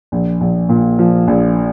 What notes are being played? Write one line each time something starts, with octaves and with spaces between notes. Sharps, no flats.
A#1
A#1
A#2
F3
A#1